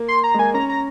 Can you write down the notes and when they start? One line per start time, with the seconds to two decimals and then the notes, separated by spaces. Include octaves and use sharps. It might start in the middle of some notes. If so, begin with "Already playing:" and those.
Already playing: A#3
0.08 C6
0.24 A#5
0.34 G#3
0.39 A#3 G#5
0.54 C#4 A#5
0.69 A#5